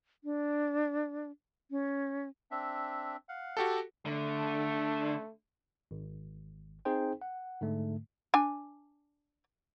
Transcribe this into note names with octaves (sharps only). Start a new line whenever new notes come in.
D4
C#4
C4 D4 E5
F5 F#5
F#4 G4 A4
D3 A3
G#1
C4 D#4 G#4 C5 G5
F#5
G#2 D3 A3
D4 G#5